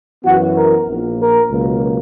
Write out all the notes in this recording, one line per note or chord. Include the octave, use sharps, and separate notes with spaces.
F#2 E3 B3 F#4
A#4
A#1 A#2 A#3
A#4
C#2 B2 F#3 A#3